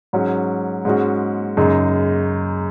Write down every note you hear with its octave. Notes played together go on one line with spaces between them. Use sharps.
G#2 F#3 C#4
G#2 G#3 C#4 F#4
F#2 C#3 G#3 D#4